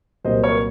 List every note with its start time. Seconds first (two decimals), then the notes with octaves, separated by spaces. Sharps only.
0.24 C2 A#2 F#3 A#3 C5 D#5
0.44 A#4 C#5